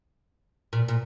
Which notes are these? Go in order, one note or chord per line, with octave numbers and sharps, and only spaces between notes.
A#2
A#2